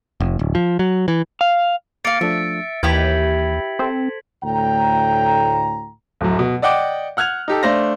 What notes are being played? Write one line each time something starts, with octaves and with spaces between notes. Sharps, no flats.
F1
D1
F3
F#3
E3
F5
A#3 F5 A6 C#7 D7
F3 A3 D4 E5
D#2 E3 E4 G4 B4 G#6 B6 F#7
C4 A4 C5
D2 A2 G5 A#5
D1 F#2
B2
D5 D#5 F#5 G5 D6
F#5 F6 F#6 G#6 F7
D#4 G4 A4
A3 D4 C5 F5 A#6